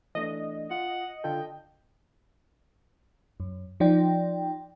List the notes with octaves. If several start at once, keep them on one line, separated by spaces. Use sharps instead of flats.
E3 A3 D4 D#5
F4 F#5
D3 F4 A4 G5
F#2
F3 D#4 D5 G5